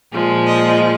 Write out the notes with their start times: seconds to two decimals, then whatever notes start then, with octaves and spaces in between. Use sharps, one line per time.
0.12 A#2 F3 G#3
0.46 D#5